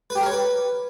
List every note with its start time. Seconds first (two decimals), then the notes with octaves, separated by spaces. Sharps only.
0.10 B4
0.16 G4
0.21 A#4
0.26 C#5
0.32 B4